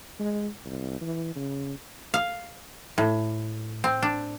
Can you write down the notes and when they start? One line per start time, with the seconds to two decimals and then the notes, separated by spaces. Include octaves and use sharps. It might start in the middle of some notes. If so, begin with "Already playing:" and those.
0.20 G#3
0.65 C2
1.01 E3
1.36 C#3
2.14 F5
2.98 A2
3.84 C4
4.03 D4